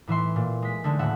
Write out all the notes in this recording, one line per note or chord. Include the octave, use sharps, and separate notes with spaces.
A2 E3 E5 C6
A#2
G#3 B6
D3 G#3 A3
D#1 A2 E5 F#5